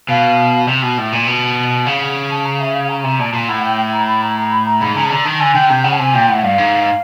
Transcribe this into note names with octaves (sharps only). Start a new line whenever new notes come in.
B2 F5
C3
B2
A2
A#2
B2
C#3 F5
F#5
A5
A#5
E5
F5
A#5
C3 A#5
A#2 A5
A#2
A2 F#5
G5
A#5
B5
A#5
A#5
B5
A#5
G#2 B5
C#3 A#5
A5
D3 A#5
D#3 A5
D3 G#5
D3 G5
C3 G5
C#3 F#5
A5
C3 G#5
A#2 G5
A2 F#5
G2 F5
G#2